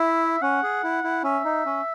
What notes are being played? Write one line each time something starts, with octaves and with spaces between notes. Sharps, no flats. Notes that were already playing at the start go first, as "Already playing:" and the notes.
Already playing: E4 E5
C#4 F#5
G#4
E4
E4
C#4 E5
D#4
C#4